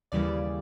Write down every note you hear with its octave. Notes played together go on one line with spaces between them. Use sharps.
D#2 C#3 E3 G3 D5